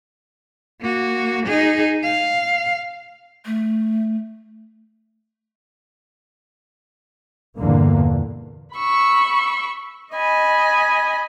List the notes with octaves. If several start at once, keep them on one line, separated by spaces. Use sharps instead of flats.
A#3 F#4
D#4 G#4
F5
A3
E2 G2 A#2 D3 A#3
B5 C#6 E6
D#5 G#5 B5